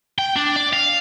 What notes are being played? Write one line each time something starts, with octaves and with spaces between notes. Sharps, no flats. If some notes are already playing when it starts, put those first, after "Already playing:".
G5
D4
D5
F5